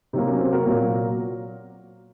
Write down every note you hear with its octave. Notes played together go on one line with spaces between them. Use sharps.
C3 F#3 A#3 C4 D#4
C#4
C4
F#4 A#4
A#2 F#3 A#3